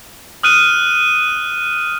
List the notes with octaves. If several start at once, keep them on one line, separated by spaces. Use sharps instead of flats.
D#6 F6 F#6 D#7